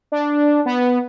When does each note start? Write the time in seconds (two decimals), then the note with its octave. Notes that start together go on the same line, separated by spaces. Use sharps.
0.12 D4
0.66 B3